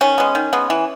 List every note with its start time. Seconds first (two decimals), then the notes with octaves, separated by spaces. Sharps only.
0.01 D#3 C#4
0.18 G#3 B3
0.35 D#3
0.53 G#3 B3
0.70 E3